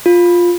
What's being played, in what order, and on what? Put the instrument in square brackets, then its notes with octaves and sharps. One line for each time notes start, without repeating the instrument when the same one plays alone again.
[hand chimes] F4